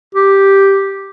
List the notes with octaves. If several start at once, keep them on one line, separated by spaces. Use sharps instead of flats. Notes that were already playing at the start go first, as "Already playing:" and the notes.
G4